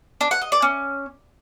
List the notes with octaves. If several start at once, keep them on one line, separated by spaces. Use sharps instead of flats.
D4
F#5
D#5
D5
C#4